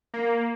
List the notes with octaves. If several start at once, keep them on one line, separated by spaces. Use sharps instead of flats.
A#3